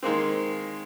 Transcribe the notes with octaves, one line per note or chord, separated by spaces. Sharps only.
D#3 G#3 A#3 C4